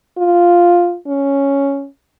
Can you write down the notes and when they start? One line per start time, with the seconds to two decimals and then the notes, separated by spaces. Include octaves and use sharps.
0.17 F4
1.07 C#4